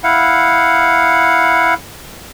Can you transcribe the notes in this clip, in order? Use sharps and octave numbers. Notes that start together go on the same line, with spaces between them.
E4 F5 F#5